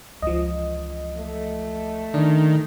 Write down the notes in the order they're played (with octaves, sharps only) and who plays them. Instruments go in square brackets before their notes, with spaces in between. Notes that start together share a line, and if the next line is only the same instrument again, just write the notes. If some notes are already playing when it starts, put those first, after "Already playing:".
[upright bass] C#2 E3 [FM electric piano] F3 D#5
[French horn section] A3
[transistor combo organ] D#3 [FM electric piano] D4